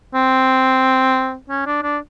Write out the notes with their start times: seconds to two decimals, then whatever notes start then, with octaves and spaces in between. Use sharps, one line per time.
0.15 C4
1.50 C#4
1.66 D4
1.83 D4